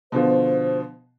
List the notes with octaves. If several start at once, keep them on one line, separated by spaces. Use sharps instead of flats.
B2 D3 F3 C5